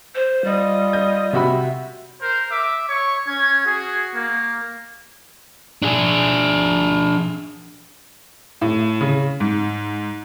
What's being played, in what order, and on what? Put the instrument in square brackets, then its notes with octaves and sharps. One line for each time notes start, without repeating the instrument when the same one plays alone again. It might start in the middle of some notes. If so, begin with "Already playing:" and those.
[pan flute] C5
[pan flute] G3 [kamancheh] F4 D#5
[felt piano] G6
[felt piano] C3 F#4 B5 [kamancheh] E5
[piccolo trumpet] A#4 [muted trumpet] C5
[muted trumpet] E5 [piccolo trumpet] D6
[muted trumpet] C#5 [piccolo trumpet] C#6
[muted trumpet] C#4 [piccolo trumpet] G#6
[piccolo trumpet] F#4 [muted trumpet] G#4
[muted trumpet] A#3
[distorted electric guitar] D4 G#4
[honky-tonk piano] A2
C#3
G#2